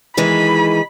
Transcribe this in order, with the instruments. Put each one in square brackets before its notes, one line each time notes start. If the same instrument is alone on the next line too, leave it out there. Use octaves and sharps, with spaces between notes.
[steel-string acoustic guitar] D#3 E3 G#3 [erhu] B5